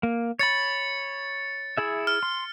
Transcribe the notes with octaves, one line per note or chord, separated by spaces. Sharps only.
A#3
C#5 B5 A6 C#7
E4 G#4 E5
F6
C6